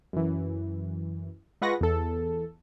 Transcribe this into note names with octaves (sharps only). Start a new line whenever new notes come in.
F#2 E3
G#3 F4 B4 F#5 C#6 A#6
E2 A4